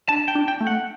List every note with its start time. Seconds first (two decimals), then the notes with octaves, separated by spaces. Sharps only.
0.09 D4 A5
0.28 G5
0.35 D4
0.48 G5
0.61 A3
0.67 F#5